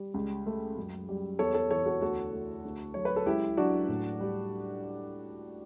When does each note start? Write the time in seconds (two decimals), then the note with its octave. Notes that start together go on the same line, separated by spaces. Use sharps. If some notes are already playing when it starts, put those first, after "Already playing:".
Already playing: G3
0.14 C#2
0.46 A3
0.77 F#2
1.09 G3
1.39 E2 A4 C#5
1.54 A4 C#5
1.71 E3 A4 C#5
1.86 F#4 A4
2.01 D2 F#4 A4
2.33 A3
2.65 D2
2.94 F#3 C#5
3.05 B4
3.16 A4
3.26 C#2 E4 G4
3.57 F#3 D4 F#4
3.88 A2
4.21 G3